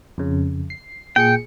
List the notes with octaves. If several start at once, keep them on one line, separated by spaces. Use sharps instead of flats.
F2 C#3
C7
A#2 G#4 G5 C#7